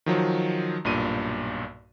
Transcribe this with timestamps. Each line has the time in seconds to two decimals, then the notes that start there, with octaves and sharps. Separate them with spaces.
0.06 D#3 F3 F#3
0.85 B1 G2 A#2 D#7